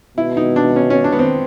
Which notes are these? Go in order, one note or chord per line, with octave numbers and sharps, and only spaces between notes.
B2 E4
D#4
D4
C#4
C#4
D4
B3
C4